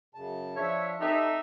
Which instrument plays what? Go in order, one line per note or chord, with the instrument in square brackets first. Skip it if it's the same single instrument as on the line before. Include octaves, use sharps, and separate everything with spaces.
[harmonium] F#2 C#3 A5
[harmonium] F3 D4 [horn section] C#5 E5
[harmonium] C4 G4 A4 [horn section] D#4 E5